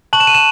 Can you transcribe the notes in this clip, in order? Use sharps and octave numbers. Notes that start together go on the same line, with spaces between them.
A5 C#6 F#6 F#7
E7
D#7
E7